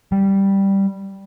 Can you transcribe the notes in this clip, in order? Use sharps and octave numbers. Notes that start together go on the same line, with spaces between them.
G3